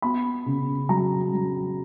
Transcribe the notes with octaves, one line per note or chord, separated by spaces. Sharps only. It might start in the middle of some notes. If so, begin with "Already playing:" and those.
B3 B5
C#3
F#3 A#5
F#3